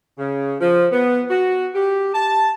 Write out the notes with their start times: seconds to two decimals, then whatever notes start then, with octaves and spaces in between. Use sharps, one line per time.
0.18 C#3
0.60 F3
0.92 B3
1.30 F#4
1.74 G4
2.14 A5